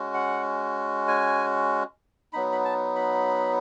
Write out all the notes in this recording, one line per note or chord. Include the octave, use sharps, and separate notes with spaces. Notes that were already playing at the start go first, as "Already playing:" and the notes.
Already playing: G#3 C#4 F#4
F#5
G#5
F#3 B3 D#4 B5
B5
A5
B5